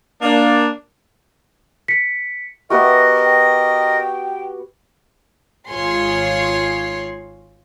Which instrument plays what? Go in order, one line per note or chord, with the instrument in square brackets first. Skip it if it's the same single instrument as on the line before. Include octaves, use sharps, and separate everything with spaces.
[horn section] A#3 D4
[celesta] B6 C#7
[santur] B3 F#4 G4 [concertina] A#4 D#5 [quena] E5 [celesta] C#6
[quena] G5
[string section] G#1 F4 G#4 C#5 C6